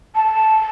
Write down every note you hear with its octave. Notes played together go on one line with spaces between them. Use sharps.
A5